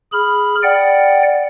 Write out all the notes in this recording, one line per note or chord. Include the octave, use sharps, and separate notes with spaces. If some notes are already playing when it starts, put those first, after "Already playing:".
G#4 B5 F6
D5 F#5 G5